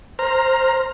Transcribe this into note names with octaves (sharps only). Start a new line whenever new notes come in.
C5 A#5 F6